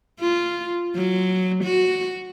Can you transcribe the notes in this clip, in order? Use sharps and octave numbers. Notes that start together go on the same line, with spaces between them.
F4
F#3
F#4